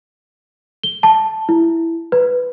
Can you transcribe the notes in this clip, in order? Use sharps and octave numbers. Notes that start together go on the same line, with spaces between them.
G7
A5
E4
B4